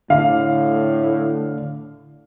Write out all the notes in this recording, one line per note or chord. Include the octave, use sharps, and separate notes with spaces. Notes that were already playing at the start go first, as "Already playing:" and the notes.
A2 D3 F5